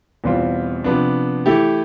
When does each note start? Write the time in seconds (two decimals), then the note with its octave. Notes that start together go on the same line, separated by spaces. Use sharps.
0.24 E2 B2 G3 C4 F4
0.84 C3 F3 B3 D4
1.46 E3 A3 E4 G4